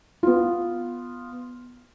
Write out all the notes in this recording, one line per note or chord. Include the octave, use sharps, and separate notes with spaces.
B3 F4